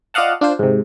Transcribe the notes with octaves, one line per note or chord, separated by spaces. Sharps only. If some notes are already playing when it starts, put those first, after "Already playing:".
F4 D5 D#5 F5 F#5 A5
D4 F4 C5
G#2 C3